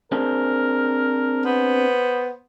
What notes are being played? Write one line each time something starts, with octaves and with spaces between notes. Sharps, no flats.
C4 D4 G#4 A#4
B3 C5